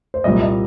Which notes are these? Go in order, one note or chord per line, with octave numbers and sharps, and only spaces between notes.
C5
C2 A#2 G3 D#5
D#5